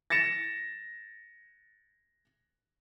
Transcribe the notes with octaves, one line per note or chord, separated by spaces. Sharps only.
A6 A#6 C#7 E7